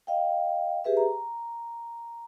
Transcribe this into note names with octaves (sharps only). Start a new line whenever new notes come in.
D#5 F5 G5
G4 G#4 B4 E5
A#5